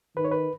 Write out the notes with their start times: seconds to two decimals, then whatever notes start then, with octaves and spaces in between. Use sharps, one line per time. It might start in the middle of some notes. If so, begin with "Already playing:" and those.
0.17 D#3 B4
0.25 C#5
0.31 B4